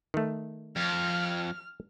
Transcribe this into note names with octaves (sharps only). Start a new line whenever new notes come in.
D#3 A3
F2 F6